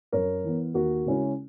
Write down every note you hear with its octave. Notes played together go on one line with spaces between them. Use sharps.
F#2 A#4 C#5
E3 B3
D#2 F#4 A#4
C#3 G#3 C#4 E4